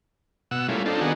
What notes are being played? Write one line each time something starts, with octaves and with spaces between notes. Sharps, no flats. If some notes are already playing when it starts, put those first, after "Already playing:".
B2 F#5 E6
G3 A3 A#3 C#4 E4 F4
C4 D4 D#4 F4 A4
D#3 B3 D4 D#4 F#4 G#4